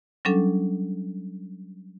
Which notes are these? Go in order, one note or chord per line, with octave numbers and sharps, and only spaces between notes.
F#3 G3 C#4 D4 A4